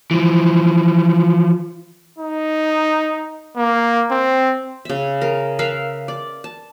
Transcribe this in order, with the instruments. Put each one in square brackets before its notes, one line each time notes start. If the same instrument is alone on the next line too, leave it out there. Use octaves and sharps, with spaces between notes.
[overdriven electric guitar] E3 F3
[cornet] D#4
A#3
C4
[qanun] C#3 E5
G#4 A#4
A#4 B4 E5 F5
D5
A5